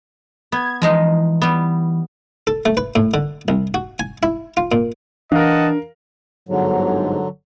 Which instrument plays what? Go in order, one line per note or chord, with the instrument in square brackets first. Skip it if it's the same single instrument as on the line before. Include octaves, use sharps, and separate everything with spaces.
[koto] B3 [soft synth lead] G#6
[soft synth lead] E3 [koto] F3 G#3 D#4
[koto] G3 B3
[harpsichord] A4
A3
B4
A2
D3
C2
F#4
G#5
E4
F4
A#2
[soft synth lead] E3 [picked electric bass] D4 [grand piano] A#4 F5 [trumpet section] D#5 F#5 A5
[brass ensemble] G1 G#2 [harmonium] D3 F#3